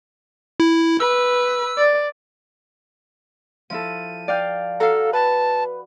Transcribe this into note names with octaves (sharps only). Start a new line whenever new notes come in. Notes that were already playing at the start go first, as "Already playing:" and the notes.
E4
B4 E6
D5
F3 E4 A4 D#7
D5 F5 G5
F#4 A4 F5 A#5
B4 A5